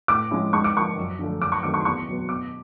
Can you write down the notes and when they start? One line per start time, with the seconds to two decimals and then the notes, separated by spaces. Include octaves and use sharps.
0.08 A2 D6
0.31 F3 G#3 C#4 E4
0.53 G#2 C#6
0.64 D6
0.74 F3 A#3 C#6
0.98 F#2
1.19 D3 F3 A3
1.40 F#2 D6
1.52 C#6
1.63 D#3 F#3 A3 C4 D6
1.74 C#6
1.80 C6
1.85 E2 C#6
2.07 B2 F#3 B3
2.28 B2 D6